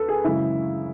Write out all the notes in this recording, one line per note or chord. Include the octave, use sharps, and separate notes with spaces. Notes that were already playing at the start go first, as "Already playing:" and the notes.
Already playing: D2 D3 A4 B4
G#4
F#2 C#3 E3 G#3 E4